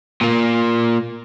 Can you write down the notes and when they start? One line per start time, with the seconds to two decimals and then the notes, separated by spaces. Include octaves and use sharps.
0.21 A#2 A#3